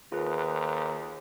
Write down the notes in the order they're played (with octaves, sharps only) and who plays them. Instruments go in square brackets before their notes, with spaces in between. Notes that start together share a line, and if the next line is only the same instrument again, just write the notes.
[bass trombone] D#2 [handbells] F4 G#4 B4